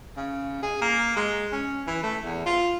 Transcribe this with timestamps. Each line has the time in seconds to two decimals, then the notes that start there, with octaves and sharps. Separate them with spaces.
0.16 C#3
0.62 G#4
0.81 A#3
1.16 G#3
1.52 C#4
1.87 E3
2.03 A3
2.24 E2
2.46 F4